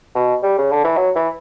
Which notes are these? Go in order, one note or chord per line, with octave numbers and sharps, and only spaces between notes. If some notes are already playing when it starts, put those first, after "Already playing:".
B2
G3
C#3
D3
E3
F#3
E3